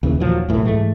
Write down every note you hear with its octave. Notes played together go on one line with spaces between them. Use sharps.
D#2 C#3 E3
D#2 A#2 F3 F#3
B1 A2 E3
G#2 E3 G#3 A3